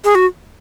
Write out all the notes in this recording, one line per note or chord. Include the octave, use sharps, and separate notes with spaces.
G#4
F#4